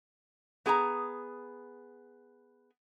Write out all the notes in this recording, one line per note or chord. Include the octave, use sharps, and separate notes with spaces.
B3 G#4 A5 A#5